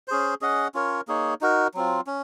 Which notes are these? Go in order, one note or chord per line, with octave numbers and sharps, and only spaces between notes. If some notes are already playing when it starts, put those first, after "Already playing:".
C#4 G#4 C5
C#4 G#4 D#5 F#5
C#4 F4 A#4 C#5
A#3 D#4 G#4 C#5
D#4 F#4 A#4
F#3 C4 F4
C#4